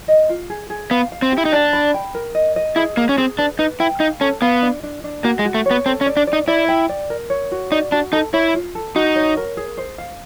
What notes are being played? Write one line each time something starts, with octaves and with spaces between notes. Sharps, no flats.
D#5
F4
G#4
G#4
B3 F5
F5
C4
G4
E4
D#4
D4 D5
B5
G5
A#4
D#5
D#5
E4 G#4
A#3 G#4
C#4
C4 G#4
D4 B4
D#4 B4
E4 G5
D#4 F5
C#4 A4
B3 F5
D4
D4
D4
A#3 F#4
G#3
F#4
A3
B3 C#5
C4 A4
C#4
D5
D4
D5
D#4
E4 D5
G5
D5
A#4
C#5
F#4
D#4 D5
D4 F#4
D#4 A4
E4 C#5
F4
A4
D#4 F#4
C#5
A#4
G#4
C5
F5